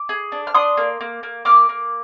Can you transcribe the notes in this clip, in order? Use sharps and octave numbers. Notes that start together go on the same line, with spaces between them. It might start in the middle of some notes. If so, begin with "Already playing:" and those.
Already playing: D6
G#4
D4
F6
D4 C6 D#6
A#3
A#3
A#3
A#3 D6 F6
A#3